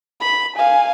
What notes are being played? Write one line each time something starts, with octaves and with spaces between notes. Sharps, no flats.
B5
F5 G#5